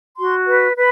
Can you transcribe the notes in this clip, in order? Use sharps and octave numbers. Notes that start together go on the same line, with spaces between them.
F#4 C6
B4
B4 B5